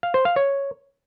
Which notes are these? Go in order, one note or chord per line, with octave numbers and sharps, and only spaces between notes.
F5
C5
F5
C#5